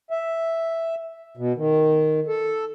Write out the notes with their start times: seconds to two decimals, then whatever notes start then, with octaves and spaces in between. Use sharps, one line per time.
0.11 E5
1.37 B2
1.57 D#3
2.27 A4